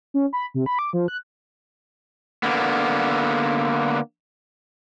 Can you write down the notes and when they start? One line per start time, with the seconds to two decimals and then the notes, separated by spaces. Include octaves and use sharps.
0.14 C#4
0.33 B5
0.54 C3
0.66 B5
0.79 D6
0.93 F3
1.08 F#6
2.43 D3 A#3 B3